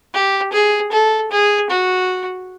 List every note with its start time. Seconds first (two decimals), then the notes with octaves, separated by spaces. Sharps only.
0.14 G4
0.53 G#4
0.92 A4
1.32 G#4
1.70 F#4